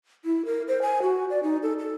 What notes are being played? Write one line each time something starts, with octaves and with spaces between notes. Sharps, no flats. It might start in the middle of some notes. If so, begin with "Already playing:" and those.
E4
A#4
C5
G#5
F#4
D5
D#4
A4
A4